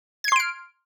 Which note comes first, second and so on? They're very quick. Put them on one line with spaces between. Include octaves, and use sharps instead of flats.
G#6 C7 C6 D7 F6